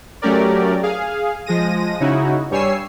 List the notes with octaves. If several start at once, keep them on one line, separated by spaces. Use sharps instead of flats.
F#3 A3 C#4 G4 A#4 D5
G#4 F5
F3 G#3 A#6 D#7
C#3 C#4 D#4 E4 F#4
G2 G3 C#5 G#5 E6 C7